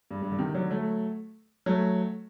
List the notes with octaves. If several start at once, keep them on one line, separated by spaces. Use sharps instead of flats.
G2
G2
D3
C3 D#3
D3 F#3
F#3 A3
F#3 A3